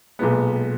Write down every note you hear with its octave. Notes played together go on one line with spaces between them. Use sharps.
B1 A#2 G#3 B3